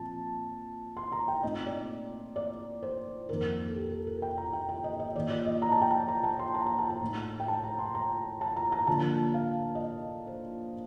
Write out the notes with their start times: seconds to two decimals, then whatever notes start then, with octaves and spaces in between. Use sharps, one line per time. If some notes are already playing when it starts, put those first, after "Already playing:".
Already playing: A#2 F3 C4 F4 A5
0.97 C6
1.12 A#5
1.28 G5
1.43 A#2 A3 C4 D#4 D#5
1.66 D5
2.36 D5
2.83 C5
3.29 F2 D#3 A#3 D#4 A#4
3.68 A4
3.76 G4
3.91 A4
4.07 A#4
4.22 G5
4.38 A#5
4.53 G5
4.69 G5
4.84 D#5
5.00 D#5
5.15 D#3 A#3 F4 D5
5.30 D5
5.46 D#5
5.62 A#5
5.72 A5
5.82 G5
5.91 A5
6.08 A#5
6.24 A5
6.39 C6
6.54 A#5
6.66 A#5
6.78 A5
6.90 A#5
7.01 A2 A3 D#4
7.40 G5
7.48 A5
7.64 A#5
7.79 C6
7.95 A#5
8.41 A5
8.56 A#5
8.72 A#5
8.87 D3 F3 A#3 F4 A5
9.34 F5
9.75 D#5
9.80 D5
10.27 C5